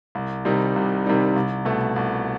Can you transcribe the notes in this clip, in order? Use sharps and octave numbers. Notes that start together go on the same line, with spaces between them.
C2
C3 D#3 G3 D#4
C2
C3 D#3 G3 D#4
C2
B2 A3
C2